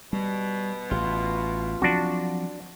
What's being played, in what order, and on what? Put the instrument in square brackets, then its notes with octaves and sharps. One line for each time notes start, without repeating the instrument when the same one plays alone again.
[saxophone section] B2 [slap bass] G3
[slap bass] A1 [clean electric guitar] F4
[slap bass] F3 F#3 C4 [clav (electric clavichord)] D4 F#4